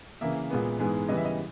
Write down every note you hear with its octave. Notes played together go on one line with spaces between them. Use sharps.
C#3 E3 A#3 E5
A#2 G#3 B3
G#2 E3 G#3 B3
C#3 E3 G3 B3 D#5
E5
D#5